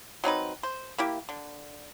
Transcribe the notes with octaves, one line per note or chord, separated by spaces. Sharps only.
F#3 C4 D#4 B4
C5
A#3 E4 G4
D3